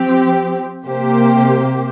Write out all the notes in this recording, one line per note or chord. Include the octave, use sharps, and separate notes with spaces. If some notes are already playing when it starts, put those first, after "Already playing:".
Already playing: F3 C4 G4
C3 A#3 G4 C5